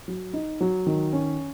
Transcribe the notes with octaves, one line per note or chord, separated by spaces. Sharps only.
F#3
D#4
F#3
D#3
C#4